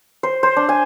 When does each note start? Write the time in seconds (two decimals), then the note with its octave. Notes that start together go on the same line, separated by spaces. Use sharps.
0.23 C5
0.43 C5
0.56 D4
0.69 G#5